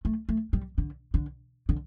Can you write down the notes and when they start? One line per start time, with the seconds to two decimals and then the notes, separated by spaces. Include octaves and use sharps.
0.05 A3
0.29 A3
0.53 G3
0.78 D3
1.14 D3
1.69 D3